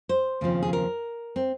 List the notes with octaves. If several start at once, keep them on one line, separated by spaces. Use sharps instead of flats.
C5
D#2 C#3 F3 C4
G#4
A#4
C4